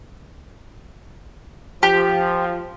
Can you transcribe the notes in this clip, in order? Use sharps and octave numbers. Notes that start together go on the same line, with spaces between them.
F3 G4